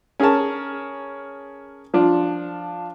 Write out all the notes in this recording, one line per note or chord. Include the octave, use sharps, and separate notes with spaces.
C#4 G#4 A#4 C#5 A5
F3 D4 F4